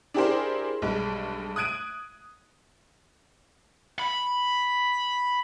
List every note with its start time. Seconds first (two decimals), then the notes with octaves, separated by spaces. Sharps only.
0.14 D4 E4 G4 G#4 A#4 C5
0.82 B1 G2 G#3
1.56 D#6 F#6 G#6 D7 D#7
3.99 B5